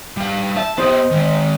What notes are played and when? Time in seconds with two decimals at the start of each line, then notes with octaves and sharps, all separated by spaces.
0.17 G3 F5
0.56 E5 A5
0.78 B3 G4 C5 D#5
1.11 D#3 G#3